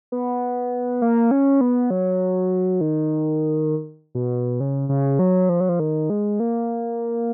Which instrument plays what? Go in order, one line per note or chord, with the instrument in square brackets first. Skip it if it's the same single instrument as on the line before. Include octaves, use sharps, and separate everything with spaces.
[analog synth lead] B3
A#3
C#4
B3
F#3
D#3
B2
C#3
C#3
F#3
F3
F#3
F3
D#3
G#3
A#3